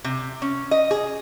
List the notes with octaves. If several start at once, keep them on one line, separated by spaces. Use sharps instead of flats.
C3
C#4
D#5
G#4